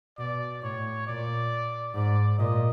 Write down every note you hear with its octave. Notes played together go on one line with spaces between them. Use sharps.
B2 D5
A2 C#5
A#2 D5
G#2 D5
A#2 D#5